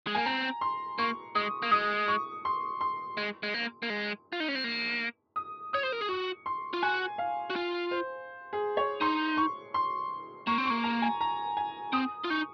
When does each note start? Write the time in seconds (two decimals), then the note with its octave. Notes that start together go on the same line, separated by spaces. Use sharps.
0.07 G#3
0.15 A#3 G#5
0.26 C4 A#5
0.61 C6
0.99 A#3 C#6
1.35 G#3 D#6
1.63 A#3
1.71 G#3 D#6
2.08 C#6
2.45 C6
2.81 C6
3.17 G#3
3.43 G#3
3.54 A#3
3.83 A#3
3.90 G#3
4.33 F4
4.40 D#4
4.48 C#4
4.55 C4
4.64 A#3
5.36 D#6
5.73 C#5 D#6
5.83 C5
5.92 A#4
6.01 G#4
6.09 F#4 C#6
6.46 C6
6.73 F4
6.82 F#4 G#5
7.18 F5
7.50 F#4
7.56 F4
7.91 C5
8.53 G#4
8.77 C#5
9.01 D#4 C6
9.37 C#6
9.74 C6
10.47 A#3 C#6
10.58 C4
10.65 A#3 C#6
10.84 A#5
11.02 G#5
11.21 A#5
11.57 G#5
11.93 C4 D#6
12.24 F4
12.30 D#4 C#6